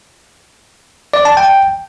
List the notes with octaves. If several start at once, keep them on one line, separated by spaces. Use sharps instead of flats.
D5
A5
G5